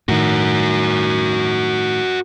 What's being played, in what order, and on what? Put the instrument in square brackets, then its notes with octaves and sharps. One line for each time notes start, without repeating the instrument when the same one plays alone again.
[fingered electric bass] A2 D#3 [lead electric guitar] F#4 A#4